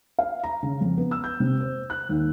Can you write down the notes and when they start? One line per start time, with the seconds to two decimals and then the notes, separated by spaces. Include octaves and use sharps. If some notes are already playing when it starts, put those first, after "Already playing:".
0.19 F5
0.44 A#5
0.63 C#3
0.81 F2
0.97 B3
1.11 E6
1.24 G6
1.40 C3
1.60 C5
1.90 F#6
2.09 D#2